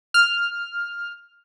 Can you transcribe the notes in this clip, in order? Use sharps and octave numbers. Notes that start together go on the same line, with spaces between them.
F6